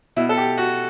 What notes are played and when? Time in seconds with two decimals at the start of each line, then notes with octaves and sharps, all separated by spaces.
0.16 B2 E4
0.29 A4
0.37 G4
0.58 F#4